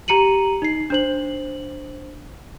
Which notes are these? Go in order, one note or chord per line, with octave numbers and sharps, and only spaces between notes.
G4 A#5 C#7 D#7 F#7
D#4 C7
D4 C5 F#7